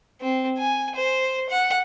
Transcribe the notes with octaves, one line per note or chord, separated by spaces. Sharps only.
C4
G#5
C5
F#5